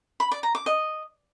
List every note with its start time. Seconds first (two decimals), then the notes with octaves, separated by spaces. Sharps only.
0.20 B5
0.31 D5
0.43 A#5
0.55 D6
0.66 D#5